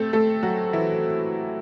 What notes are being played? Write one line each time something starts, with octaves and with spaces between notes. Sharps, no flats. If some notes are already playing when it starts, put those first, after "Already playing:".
Already playing: A3 C4 A4
A3 A4
F#3 F#4
E3 E4